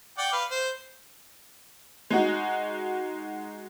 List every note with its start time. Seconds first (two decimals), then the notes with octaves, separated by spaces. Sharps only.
0.18 D5 F#5 G5
0.33 B4 F5
0.51 C5
2.10 G#3 D#4 F#4